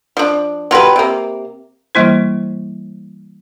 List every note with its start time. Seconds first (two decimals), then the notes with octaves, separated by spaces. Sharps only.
0.17 F3 D4
0.71 F#3 F4 G4 B4
0.96 C3 A#3
1.95 E3 G3 A#3 E4 C5